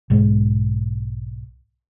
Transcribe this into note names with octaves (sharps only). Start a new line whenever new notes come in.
B1 G#2 G#3